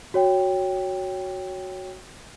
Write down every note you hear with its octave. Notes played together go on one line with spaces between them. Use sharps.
F#4 C#5 G5